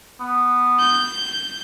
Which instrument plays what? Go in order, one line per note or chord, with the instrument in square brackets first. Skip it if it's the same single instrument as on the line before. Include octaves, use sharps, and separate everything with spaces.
[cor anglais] B3
[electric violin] G6